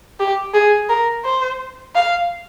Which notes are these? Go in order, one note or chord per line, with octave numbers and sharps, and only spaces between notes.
G4
G#4
A#4
C5
F5